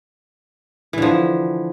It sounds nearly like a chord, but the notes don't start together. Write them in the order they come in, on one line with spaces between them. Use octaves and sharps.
E3 D3 F3